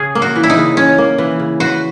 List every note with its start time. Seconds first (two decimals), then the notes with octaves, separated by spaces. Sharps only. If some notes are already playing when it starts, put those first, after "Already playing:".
Already playing: C#3 G#4
0.15 A#3
0.22 F#4
0.36 E3
0.43 E4
0.50 D#4
0.57 C#3
0.77 C#3 C#4
0.98 A#3
1.18 E3
1.39 C#3
1.60 F#4 B4